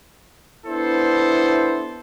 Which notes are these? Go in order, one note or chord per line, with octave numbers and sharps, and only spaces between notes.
B3 D4 E4 A4 C5